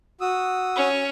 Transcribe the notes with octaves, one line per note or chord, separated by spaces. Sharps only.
F#4 D#6 E6
C#4